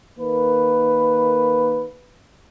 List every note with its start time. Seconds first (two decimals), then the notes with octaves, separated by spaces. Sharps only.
0.18 D#3 A#3 B4